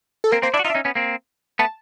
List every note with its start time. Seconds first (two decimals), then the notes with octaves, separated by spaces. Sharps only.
0.24 A4
0.32 A#3 C4 A#4
0.42 A#3 C4 C5
0.54 D4 E4 D5
0.59 F#4
0.64 D#4 F4 E5
0.70 D4
0.75 C#4 D#4
0.85 B3 C#4
0.95 A#3 C4
1.59 A3 B3 A5